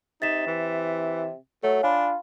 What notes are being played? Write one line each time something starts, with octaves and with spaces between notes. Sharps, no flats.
C3 D#4 A6 B6 E7
E3
F#3 A3 C#5
D4 F4 G#5 B5